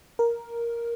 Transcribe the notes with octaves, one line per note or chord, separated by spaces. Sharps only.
A#4